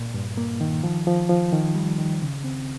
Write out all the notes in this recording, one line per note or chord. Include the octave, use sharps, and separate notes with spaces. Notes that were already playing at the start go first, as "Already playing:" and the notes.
Already playing: A#2
G2
A#3
D#3
F3
F3
F3
D#3
G3
D#3
C#3
C4